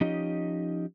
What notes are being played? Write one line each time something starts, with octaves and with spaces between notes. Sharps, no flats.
F3 C#4 D#4 G4 D#5